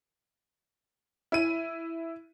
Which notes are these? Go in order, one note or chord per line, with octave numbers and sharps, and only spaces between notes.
E4 D#7